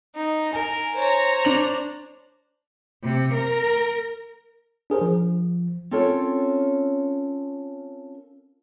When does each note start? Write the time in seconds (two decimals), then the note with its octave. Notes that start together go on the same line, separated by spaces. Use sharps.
0.15 D#4
0.53 A#4 G#5
0.97 C5 C#5 A#5
1.45 D4 F7
3.04 C3
3.34 A#4
4.90 D4 G#4 A#4 C5
5.01 F3
5.91 C4 C#4 F4 A4 A#4 C#5